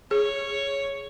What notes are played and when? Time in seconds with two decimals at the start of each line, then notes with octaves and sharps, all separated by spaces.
0.11 G#4 C#5